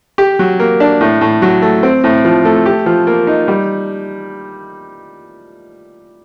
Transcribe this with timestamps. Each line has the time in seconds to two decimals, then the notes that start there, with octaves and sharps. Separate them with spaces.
0.18 G4
0.39 F#3
0.59 A#3
0.80 D4
1.01 A2
1.21 A2
1.42 F#3
1.62 A3
1.83 C4
2.04 A2
2.25 F3
2.45 A3
2.66 G4
2.86 F3
3.07 A#3
3.27 D#4
3.48 G3